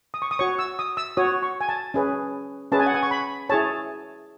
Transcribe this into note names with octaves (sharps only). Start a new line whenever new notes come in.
D#6
C#6
D#6
F#4 C#5 C#6
E6
D#6
E6
F#4 C#5 D#6
C#6
G#5
A5
C#4 G#4 B4
C#4 G#4 B4 A5
G#5
F#5
G#5
C#6
B5
E4 G#4 C#5 A5